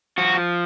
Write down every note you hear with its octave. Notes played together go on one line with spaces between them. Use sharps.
F3 F#4